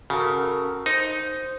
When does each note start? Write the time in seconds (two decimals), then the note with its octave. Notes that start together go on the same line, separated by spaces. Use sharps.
0.10 C#3 F#4 A4 A#4
0.86 D#4 C5